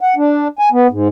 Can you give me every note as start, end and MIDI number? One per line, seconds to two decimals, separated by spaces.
0.01 0.15 78
0.16 0.48 62
0.59 0.69 80
0.72 0.87 59
0.90 1.08 44